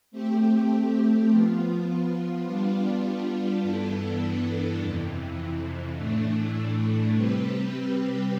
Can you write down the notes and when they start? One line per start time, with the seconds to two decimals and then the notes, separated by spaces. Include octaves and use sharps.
0.11 A3 C4 G4
1.28 F3 B3 F4
2.46 G3 B3 D4 F4
3.63 G2 E3 B3 D4 A4
4.80 F2 C3 E3
5.96 A2 E3 A3 D4
7.13 C3 G3 C4 G4 B4